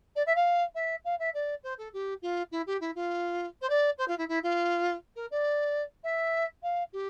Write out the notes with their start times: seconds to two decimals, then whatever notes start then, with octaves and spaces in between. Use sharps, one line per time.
0.16 D5
0.26 E5
0.35 F5
0.75 E5
1.04 F5
1.19 E5
1.34 D5
1.63 C5
1.78 A4
1.93 G4
2.22 F4
2.52 E4
2.66 G4
2.81 E4
2.95 F4
3.61 C5
3.69 D5
3.98 C5
4.08 F4
4.18 E4
4.28 E4
4.43 F4
5.15 A#4
5.31 D5
6.04 E5
6.62 F5
6.93 G4